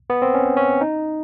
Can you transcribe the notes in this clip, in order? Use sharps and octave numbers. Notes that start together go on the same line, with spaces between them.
B3
C4
C#4
C#4
D#4